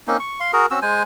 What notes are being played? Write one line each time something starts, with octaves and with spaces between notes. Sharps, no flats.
A#3 C4 C#4 D#4
C#6
F5 C6
F#4 G#4 A#4
C4 C#4 F#4 E6
G#3 C5 G#5